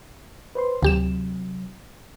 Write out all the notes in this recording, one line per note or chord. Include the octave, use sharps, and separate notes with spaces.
B4 C5 C6
D2 C3 F#3 G4 E7